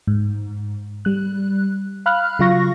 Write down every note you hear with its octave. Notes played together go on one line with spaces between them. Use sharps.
G#2
G3 F#6
F5 B5 F6 F#6
C#3 F#3 F4 F5 C#6 A#6